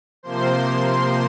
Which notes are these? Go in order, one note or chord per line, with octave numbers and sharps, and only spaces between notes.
C3 F3 A#3 C5 C6
C5 C6